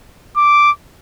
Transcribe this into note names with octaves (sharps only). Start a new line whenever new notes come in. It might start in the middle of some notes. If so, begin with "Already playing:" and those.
D6